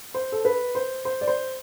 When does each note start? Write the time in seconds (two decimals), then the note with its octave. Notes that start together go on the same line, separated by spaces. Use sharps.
0.14 C5
0.32 A4
0.45 B4
0.75 C5
1.05 C5
1.21 D5
1.28 C5